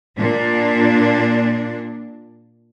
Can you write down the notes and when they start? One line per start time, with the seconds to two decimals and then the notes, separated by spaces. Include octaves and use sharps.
0.18 A#2 D4